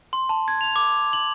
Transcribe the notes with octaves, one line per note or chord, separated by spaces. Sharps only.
C6
A5
G#6
F7
D6
F#7